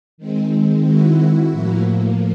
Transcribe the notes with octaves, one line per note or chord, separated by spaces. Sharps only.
D#3 G#3 C4
E4 F#4
A2 F3 A#3